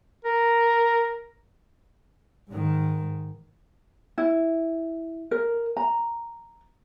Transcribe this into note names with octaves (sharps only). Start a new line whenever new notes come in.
A#4
G#2 D#3
E4
A#4
A#5